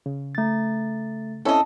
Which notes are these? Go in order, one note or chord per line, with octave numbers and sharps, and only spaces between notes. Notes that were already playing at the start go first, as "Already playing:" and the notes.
C#3
A3 A6
C4 C#4 E4 A4 D#5